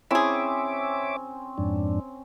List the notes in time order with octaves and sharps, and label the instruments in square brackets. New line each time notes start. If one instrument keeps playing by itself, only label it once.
[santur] C4 C#4 G#5 [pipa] E4 G#4 [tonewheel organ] C#5 E5 D6
[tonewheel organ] F2 G#2 D4